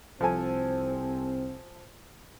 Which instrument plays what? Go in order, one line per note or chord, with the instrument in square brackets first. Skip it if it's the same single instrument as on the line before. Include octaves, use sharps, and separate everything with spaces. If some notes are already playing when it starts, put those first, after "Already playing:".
[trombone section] C2 C4 [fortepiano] F3 A4 G#5